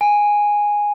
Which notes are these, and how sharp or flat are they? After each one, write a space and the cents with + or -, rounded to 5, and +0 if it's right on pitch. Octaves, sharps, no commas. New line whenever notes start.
G#5 -5